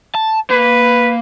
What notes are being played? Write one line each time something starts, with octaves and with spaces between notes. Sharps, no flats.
A5
A#3 B4